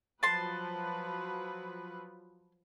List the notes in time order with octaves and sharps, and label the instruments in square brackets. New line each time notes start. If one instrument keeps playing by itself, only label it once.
[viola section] F3 F#3 B4 [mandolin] A5 C6